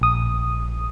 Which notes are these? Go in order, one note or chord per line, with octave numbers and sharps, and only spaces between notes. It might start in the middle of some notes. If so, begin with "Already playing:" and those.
A#1 D#6